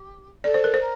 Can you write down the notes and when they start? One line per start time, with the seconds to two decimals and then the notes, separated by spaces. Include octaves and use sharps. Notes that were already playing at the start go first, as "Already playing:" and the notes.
Already playing: G4
0.44 A4 D5
0.54 C5
0.64 A#4
0.74 C5
0.80 A#4